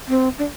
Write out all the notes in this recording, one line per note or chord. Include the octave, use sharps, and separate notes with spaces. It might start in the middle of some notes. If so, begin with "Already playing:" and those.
C4
D4